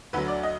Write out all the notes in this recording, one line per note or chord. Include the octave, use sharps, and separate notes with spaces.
D2 D3 F#3 B4
D5
D#5